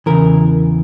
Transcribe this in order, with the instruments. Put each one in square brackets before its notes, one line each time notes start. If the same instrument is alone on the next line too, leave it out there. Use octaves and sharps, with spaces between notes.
[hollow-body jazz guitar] E2 C#3 E3 A#4